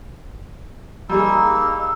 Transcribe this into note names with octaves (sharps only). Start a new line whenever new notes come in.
G3 A#3 D#4 G#4 B5 E6